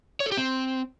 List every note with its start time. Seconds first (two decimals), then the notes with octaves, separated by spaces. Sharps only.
0.20 C#5
0.26 A4
0.32 G4
0.37 C4